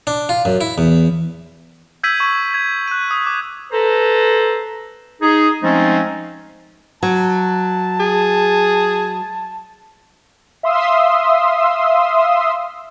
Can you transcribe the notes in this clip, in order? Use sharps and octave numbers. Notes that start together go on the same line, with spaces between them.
D4
F4
F#2
E4
E2
E6 G6 G#6 B6 D#7 F#7
C#6 G#6
G#6
F#6 D#7
D#6
D6
A4 B4 C5 A#5
D#4 G#4
F3 G#3 A3 C4 C#4 D#4
F#3 A5
G#4
E5 F5 C6 D#6 E6